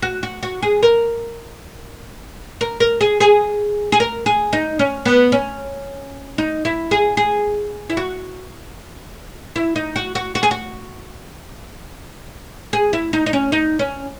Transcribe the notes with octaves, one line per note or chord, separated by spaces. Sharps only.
F#4
F#4
F#4
G#4
A#4
A#4
A#4
G#4
G#4
G#4
A#4
G#4
D#4
C#4
B3
C#4
D#4
E4
G#4
G#4
E4
F#4
E4
D#4
F#4
F#4
F#4
G#4
F#4
G#4
E4
D#4
D#4
C#4
D#4
C#4